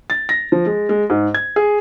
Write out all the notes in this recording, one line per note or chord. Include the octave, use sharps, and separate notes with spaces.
A6
A#6
F3
G#3
G#3
G#2
G#6
G#4